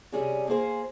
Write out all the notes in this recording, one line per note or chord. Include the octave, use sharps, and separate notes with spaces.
C3 G3 C#4 G#4
A#3 F4 G#4 C5